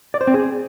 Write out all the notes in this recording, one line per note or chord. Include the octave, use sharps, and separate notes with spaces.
D5
C5
C4
G#4